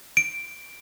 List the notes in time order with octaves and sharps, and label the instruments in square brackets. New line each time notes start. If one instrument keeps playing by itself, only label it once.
[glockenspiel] D7